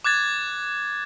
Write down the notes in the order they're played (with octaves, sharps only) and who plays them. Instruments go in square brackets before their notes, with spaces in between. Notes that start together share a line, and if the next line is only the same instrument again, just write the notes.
[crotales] D6 F#6 G#6 A6